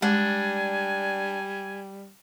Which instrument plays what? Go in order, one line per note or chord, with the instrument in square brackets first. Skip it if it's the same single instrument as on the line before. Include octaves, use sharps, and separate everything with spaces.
[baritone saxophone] G3 [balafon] G#3 [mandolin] D4 [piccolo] G#5